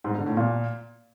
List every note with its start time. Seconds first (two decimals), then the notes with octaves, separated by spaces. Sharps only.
0.04 G#2
0.15 D3
0.26 A2
0.37 A#2